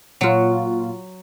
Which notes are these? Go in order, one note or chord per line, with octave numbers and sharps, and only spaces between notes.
A#2 F#3 F4 F#4